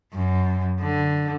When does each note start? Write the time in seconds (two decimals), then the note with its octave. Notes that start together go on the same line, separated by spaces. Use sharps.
0.13 F#2
0.80 D3